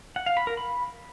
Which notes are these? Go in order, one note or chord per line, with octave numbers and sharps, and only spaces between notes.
F#5
F5
B5
A#4
B5